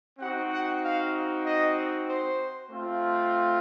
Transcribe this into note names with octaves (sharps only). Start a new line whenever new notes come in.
C4 D#4 F#4 F#5
F#5
F5
D#5
C5
A3 C4 F4